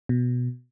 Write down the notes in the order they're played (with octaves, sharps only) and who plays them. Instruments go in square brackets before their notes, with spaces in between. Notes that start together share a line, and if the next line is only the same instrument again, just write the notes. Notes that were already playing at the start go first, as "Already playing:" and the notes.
[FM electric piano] B2